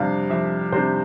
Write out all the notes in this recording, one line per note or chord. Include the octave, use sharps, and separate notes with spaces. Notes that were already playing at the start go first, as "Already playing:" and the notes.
Already playing: F2 C3 G3 D4 F5
F2 E5
C3 G3 D4 C5